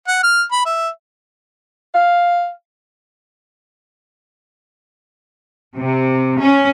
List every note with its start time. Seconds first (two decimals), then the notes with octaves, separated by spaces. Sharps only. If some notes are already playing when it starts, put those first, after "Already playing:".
0.08 F#5
0.23 F6
0.52 B5
0.66 E5
1.94 F5
5.78 C3
6.39 C#4